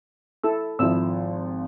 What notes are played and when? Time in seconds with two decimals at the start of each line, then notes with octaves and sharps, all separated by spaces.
0.44 E4 A4 E6
0.79 G#1 F3 E4 E6